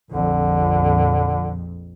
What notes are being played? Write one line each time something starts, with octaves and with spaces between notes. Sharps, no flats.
A#1 F2 D3